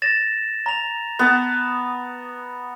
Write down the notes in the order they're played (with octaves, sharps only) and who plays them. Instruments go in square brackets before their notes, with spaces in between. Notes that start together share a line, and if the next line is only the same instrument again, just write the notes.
[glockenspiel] A6 A#6 E7
A#5 F7
[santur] B3 A5